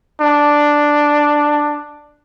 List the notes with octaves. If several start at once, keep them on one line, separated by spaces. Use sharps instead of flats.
D4